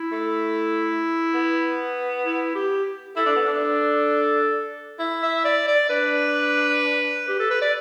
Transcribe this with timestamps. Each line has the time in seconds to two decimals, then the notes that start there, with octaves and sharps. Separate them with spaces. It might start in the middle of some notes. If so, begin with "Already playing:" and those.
Already playing: E4
0.12 A3
1.34 B3
2.26 E4
2.55 G4
3.16 E4 A4
3.26 D4
3.36 B3
3.46 D4
4.99 E4
5.22 E5
5.45 D5
5.68 D5
5.90 D4 B4
7.28 G4
7.39 A4
7.50 B4
7.61 D5